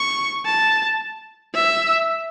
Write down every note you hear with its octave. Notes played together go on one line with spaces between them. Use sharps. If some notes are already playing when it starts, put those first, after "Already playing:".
Already playing: C#6
A5
E5